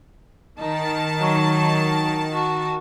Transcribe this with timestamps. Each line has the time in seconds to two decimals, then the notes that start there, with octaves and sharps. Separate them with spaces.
0.59 D#3 D#4 A5
1.20 F#3
2.33 F#4